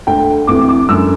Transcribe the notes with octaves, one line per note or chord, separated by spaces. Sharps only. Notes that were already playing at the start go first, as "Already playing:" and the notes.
D2 D3 G5
D2 C3 E3 D6
D6
F#2 D3 E6